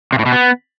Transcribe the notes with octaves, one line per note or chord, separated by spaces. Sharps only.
C3
A2
B2
B3